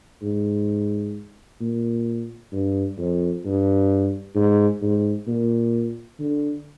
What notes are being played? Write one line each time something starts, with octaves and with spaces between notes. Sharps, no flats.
G#2
A#2
G2
F2
G2
G#2
G#2
A#2
D3